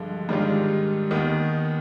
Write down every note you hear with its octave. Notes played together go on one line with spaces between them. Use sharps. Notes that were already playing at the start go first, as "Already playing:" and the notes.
Already playing: G2 D3 F3 G#3
G#2 D#3 G3 D4 F4
D#2 D#3 B3